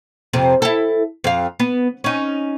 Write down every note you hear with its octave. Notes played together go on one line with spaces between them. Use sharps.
F2 C3
E4 A4
F2 F5
B3
C#4 D#4